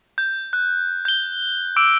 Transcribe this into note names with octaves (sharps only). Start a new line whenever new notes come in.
G6
F#6
G6 G7
D6 E6 D7